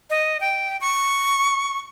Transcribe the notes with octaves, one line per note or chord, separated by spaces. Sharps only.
D#5
G5
C#6